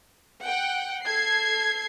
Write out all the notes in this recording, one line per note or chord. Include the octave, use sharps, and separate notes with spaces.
F#5 G5
A4 G#6 C7